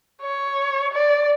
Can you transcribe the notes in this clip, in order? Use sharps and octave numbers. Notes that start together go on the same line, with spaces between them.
C#5
D5